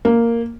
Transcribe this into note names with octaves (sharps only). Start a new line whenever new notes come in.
A#3